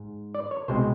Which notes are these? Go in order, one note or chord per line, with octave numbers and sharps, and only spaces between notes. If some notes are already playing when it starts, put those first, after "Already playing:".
Already playing: G#2
D5
C#5
C2 B2 G#3 C4 C5